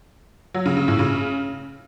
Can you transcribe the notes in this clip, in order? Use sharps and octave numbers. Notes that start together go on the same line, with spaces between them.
F#3
C#3
C#3
A2
C#3